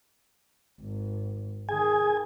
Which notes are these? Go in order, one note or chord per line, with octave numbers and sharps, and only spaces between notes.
G#1
D#3 G#4 G#5